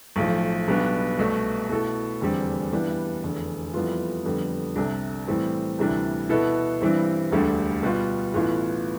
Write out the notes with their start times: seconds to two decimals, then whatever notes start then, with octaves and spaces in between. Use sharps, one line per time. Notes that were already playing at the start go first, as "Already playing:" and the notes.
0.16 B1 A2 F3
0.68 B1 B2 G3 B3 D4
1.19 C2 B2 A3
1.69 B2 A3 E4 A4
2.20 F1 E2 D3 G3 C4
2.72 G2 E3 G3 B3 D4
3.23 F1 E2 D3
3.74 F2 E3 G3 B3 F4
4.25 F2 D3 G3 B3
4.76 C2 C3 G3 D4 A4
5.28 A2 E3 G3 C4
5.79 D2 C3 E3 G3 D4
6.29 B2 B3 E4 A4
6.81 G2 E3 G3 C4
7.32 E1 D2 D3 G3
7.83 B2 G3 B3 F4
8.34 A1 A2 E3 B3 F4